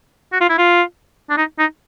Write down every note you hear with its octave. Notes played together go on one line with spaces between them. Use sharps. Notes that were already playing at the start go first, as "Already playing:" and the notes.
F#4
F4
E4
F4
D4
D#4
D#4